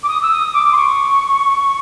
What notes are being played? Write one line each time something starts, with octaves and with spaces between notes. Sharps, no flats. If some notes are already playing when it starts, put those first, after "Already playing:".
D6
D#6
E6
D#6
D6
C6
C#6